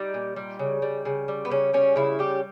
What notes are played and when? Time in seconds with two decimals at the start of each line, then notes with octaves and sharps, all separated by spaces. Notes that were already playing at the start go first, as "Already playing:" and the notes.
Already playing: G3 D#4
0.14 A#2
0.36 G3
0.59 C#3
0.82 G3
1.05 C#3
1.28 G3
1.45 B3
1.50 C#3 C#4
1.73 G3 C#4
1.96 C#3 E4
2.19 G3 G4